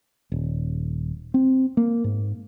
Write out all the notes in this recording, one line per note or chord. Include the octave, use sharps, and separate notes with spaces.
D#1
C4
A#3
G#2